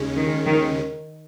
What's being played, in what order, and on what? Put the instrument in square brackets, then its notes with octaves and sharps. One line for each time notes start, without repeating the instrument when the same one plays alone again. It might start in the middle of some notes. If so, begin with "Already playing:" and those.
Already playing: [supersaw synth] D#2 C#3 G#3 C#4
[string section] D#3
D#3